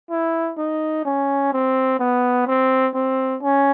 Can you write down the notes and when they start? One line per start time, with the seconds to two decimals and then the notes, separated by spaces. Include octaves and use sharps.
0.10 E4
0.58 D#4
1.05 C#4
1.52 C4
1.99 B3
2.47 C4
2.94 C4
3.42 C#4